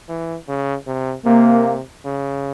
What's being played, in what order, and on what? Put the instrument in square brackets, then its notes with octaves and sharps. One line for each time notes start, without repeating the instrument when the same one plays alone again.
[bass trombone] E3
C#3
C3
[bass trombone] C3 [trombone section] A#3
[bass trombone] C#3